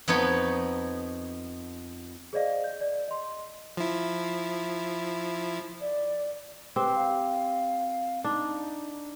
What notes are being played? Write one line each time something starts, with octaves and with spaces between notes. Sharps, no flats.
F2 B3 D#4 C#5 B5
G#4 C5 D5 D#5 F5
G6
D5
D#5 C6
F3 E4
D5
C4 G4 B4
F5
D4 D#4